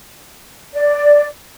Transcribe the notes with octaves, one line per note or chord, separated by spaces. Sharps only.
D5